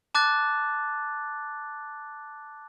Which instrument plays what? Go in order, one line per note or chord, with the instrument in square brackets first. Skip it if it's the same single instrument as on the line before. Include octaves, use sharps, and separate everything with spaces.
[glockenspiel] A5 D6 F#6 A6